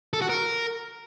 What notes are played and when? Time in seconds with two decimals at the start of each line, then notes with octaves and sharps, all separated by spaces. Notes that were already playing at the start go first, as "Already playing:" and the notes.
0.13 A4
0.21 F#4
0.29 A#4